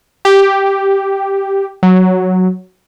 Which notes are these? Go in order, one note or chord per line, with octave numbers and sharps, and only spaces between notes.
G4
F#3